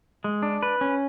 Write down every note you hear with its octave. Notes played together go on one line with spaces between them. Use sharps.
G#3
D4
B4
C#4